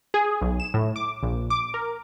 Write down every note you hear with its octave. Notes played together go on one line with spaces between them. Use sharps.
G#4
B1
E7
A2
D6
A#1
D6
A#4